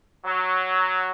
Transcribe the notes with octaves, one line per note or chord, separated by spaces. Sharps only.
F#3